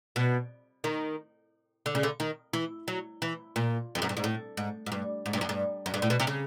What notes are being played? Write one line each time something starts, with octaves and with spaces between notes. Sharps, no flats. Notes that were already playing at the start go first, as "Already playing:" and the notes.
B2
D#3
D3
C#3
D3
D#3
E3
F#3
E3
A#2
F2
F#2
G2
G#2
A2
G#2
G#2
G2
G#2
G2
F#2
G2
F#2
G2
A2
B2
C3
C#3